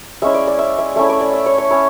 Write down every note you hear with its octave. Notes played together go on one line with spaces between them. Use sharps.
G#3 C#4 E4 E5
D5
D5
E5
E5
A3 C#4 E4 E5
D5
D5
E5
C#5
C#5
C#4 E4 C#5